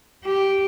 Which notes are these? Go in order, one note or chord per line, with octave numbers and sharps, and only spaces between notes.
G4